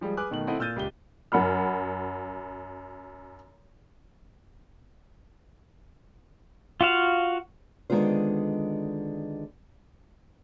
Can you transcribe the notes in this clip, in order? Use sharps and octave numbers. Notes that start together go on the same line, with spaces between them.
F3 G3 G#3 G#4
G#4 B4 G#5 D6 F6 F#6
B2 D#3 A3 F#7
C4 E4 A4 D#5 F#5
A#2 E6 F6 G6 A6 D#7
C#2 G4 G7
F#2 F#5 B5 F6
F4 F#4 F5
D3 D#3 G#3 B3 F4 C5